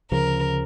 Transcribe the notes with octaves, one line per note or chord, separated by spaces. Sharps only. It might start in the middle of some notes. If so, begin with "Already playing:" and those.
D2 C#3 F3 A#4